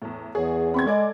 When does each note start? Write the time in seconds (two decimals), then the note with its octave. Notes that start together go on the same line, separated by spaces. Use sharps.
0.02 E2 A2
0.35 E2 G#4 C#5
0.74 C4 B5 C#6 G#6
0.86 G#3 A4 D5 D6